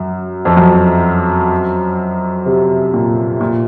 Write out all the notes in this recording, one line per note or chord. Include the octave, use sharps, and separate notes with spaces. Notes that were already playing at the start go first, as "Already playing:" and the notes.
Already playing: F#2
F2
F#2
C3
A#2
A#2